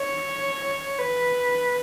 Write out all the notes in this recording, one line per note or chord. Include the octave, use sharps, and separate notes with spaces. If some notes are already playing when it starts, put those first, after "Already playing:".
Already playing: C#5
B4